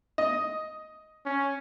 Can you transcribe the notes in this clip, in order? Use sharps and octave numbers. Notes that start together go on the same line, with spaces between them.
D#5
C#4